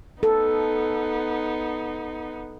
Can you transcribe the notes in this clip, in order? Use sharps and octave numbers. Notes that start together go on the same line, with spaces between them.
B3 D#4 A4